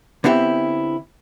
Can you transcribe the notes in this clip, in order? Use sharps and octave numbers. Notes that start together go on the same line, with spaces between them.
D3 B3 C4 E4 G4